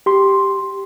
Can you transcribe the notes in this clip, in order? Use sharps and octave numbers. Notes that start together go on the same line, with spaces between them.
G4 C6